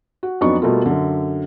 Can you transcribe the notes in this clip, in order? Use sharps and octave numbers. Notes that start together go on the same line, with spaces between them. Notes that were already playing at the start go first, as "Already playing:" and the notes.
F#4
F2 F#3 B3 D4 D#4 C#6
B2 G3 A3 A#3 F4
F#2 D3